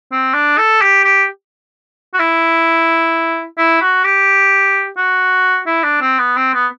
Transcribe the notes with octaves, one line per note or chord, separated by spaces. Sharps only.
C4
D4
A4
G4
G4
F#4
E4
E4
F#4
G4
F#4
E4
D4
C4
B3
C4
B3